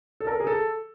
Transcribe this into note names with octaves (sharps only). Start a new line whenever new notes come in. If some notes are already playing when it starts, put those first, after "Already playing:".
A4
A#4
G#4
A4